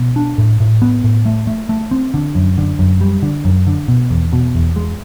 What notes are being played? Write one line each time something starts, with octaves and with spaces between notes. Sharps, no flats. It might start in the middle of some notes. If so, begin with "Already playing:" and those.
Already playing: B2
D4
A2
A2
B3
A2
A3
A3
A3
C4
D3
F#2
D3
F#2
G3
D3
F#2
D3
B2
E2
B2
E2
G#3